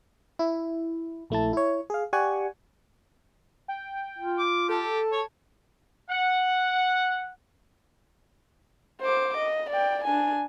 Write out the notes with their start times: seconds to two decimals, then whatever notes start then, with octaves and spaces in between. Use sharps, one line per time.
0.39 E4
1.30 A#1 A3 E4 A5
1.53 E4 C#5
1.90 G#4 F5
2.13 G4 D5 F#5 G#5 C#6
3.68 G5
4.18 F4
4.38 D6
4.69 G4 A4 A5
5.12 C#5
6.10 F#5
9.01 C5 D6
9.37 D#5
9.70 D5 G5
10.04 D4 G#5